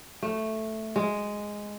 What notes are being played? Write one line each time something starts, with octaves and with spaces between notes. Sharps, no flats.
A3
G#3